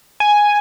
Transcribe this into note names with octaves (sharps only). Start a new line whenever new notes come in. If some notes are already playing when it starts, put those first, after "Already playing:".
G#5